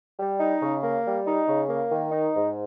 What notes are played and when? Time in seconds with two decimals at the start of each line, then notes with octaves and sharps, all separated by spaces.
0.19 G3
0.39 D#4
0.61 C#3
0.83 A#3
1.04 G3
1.26 D#4
1.47 C#3
1.69 A#3
1.90 D#3
2.12 D#4
2.34 G#2